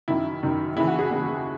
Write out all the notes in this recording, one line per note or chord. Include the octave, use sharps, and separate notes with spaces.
F#2 D#3 E4
F#2 D#3
D#2 C#3 E3 E4
F#4
G#4
D#2 C#3 E3